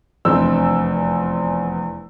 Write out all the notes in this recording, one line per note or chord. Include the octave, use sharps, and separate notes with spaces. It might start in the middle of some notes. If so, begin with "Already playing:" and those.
F1 E2 C4 D4 C5 E6